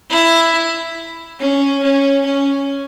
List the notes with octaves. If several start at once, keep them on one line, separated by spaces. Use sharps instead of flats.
E4
C#4
C#4
C#4